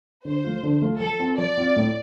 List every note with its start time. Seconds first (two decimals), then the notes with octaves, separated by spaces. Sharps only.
0.25 D3 C5
0.44 F3 A3 F4
0.63 D3
0.82 F3 A3 F4
1.00 F3 A4
1.20 C4 F4
1.38 F3 D5
1.58 C4 F4
1.76 A2